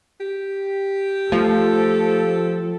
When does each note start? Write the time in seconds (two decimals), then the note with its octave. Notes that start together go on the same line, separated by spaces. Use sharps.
0.20 G4
1.32 F3 A3 A4